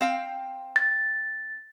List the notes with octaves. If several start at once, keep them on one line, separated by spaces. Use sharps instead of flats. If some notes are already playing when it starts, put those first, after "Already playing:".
C4 F5 G5
A6